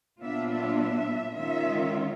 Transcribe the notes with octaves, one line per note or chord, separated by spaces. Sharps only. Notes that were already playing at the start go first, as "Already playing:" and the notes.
A#2 F#3 B3 D4 F4 E5
E5
E5
D#3 G#3 C#4 F4 E5